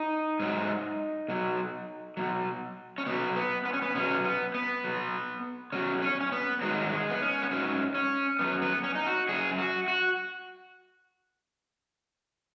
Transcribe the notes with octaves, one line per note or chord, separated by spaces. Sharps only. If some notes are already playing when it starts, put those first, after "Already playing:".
Already playing: D#4
G#2 F#3
B2 F#3
B2 F#3
C#4
B2 F#3 B3
B3
B3
C#4
B3
B2 F#3 C#4
B3
B3
B2 F#3
B2 F#3 C#4
C#4
C#4
B3
G#2 D#3 F#3 G#3
G#3
B3
C#4
B3
G#2 D#3 F#3 C#4
C#4
F#2 F#3 B3
B3
C#4
D#4
F#4
F#2 F#3 G#4
F#4
F#4